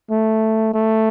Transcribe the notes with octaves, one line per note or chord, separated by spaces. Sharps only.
A3
A3